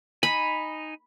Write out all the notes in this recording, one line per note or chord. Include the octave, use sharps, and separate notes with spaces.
D#4 G#5 B5